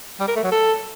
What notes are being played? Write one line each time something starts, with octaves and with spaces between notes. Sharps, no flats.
G3
A#4
A3
F#3
A4